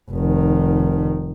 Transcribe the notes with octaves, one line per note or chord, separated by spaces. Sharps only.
F1 D#3